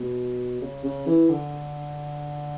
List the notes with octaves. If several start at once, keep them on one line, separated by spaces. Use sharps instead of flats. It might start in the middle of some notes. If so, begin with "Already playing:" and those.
Already playing: B2
C#3
C#3
E3
D3